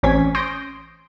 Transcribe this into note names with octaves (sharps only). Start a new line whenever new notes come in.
A1 C4 C#4 G#5 G#6 B6
C6 D#6 G6 A#6 D7